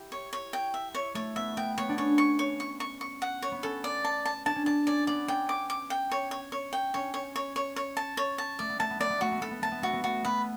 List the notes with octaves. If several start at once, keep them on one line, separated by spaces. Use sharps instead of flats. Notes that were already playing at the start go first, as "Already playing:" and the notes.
Already playing: E4 G4
C#5
C#5
G5
E5
C#5
A3 C#5
B3 E5
B3 G5
B3 C#5
D4
C#4 C#5
C#6
C#5
C#6
C#6
C#6
F#5
C#5
B3
C#4 A4
D5
A5
A5
D4 A5
C#4
D4 A5
C#4 D5
B3 D5
C#4 G5
D6
D6
G5
C#5
C#5
C#5
G5
C#4 C#5
C#5
C#5
C#5
C#5
A5
C#5
A5
A3 D5
B3
A3 A5
B3
A3 D5
B3
A3 F#4
B3
A3 A4
B3
A3 A5
B3
A3 F#4
B3
A3 F#4
B3 B4